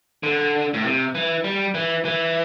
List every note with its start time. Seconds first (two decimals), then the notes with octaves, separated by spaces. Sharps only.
0.23 D3
0.74 A2
0.84 C3
1.15 E3
1.44 G3
1.74 E3
2.05 E3